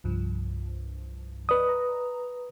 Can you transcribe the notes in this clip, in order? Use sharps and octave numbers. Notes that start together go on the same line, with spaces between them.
C2 G2 F3
B4 D5 D#5 D#6
A#5